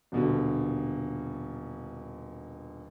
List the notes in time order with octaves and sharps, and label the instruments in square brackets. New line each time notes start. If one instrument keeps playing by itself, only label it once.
[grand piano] D#1 B2 D3